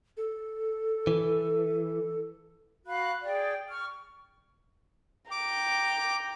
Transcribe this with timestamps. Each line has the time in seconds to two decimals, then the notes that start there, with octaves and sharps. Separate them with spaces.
0.17 A4
1.07 E3
2.87 F#4 F5 B5 F#6
3.23 G#4 D5 G5
3.69 C#6 F6
5.31 G5 A#5 D6